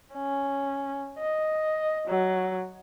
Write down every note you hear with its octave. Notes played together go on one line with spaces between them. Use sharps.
C#4
D#5
F#3